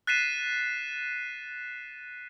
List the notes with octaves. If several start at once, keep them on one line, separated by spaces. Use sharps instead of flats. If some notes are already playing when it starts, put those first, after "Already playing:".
F#6 A6 B6 C7 D#7 E7